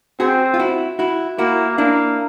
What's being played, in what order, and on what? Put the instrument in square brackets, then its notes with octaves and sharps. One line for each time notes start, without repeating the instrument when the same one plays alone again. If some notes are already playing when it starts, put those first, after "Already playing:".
[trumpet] C4 [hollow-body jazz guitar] F#4 G#4
[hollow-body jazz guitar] F4
E4 F#4
E4 F#4
[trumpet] A#3 [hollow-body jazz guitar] E4 F#4
[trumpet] A#3 [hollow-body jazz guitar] D4 E4